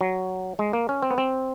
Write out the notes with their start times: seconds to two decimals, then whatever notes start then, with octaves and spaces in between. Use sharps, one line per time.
0.01 F#3
0.59 G#3
0.73 A#3
0.89 C#4
1.03 C4
1.11 B3
1.18 C4